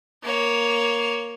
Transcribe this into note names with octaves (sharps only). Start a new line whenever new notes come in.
A#3 C#5